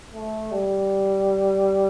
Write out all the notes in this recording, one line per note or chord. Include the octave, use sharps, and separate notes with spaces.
A3
G3